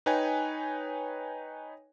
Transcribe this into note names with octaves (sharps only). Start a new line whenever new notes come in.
D#4 B4 C#5 G5 G#5